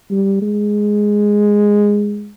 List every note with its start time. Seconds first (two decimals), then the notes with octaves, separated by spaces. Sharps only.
0.11 G3
0.42 G#3